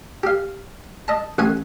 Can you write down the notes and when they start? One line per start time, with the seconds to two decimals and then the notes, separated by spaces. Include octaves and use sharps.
0.23 G4 F5
1.08 D#5 A5
1.38 A1 F#5 G#5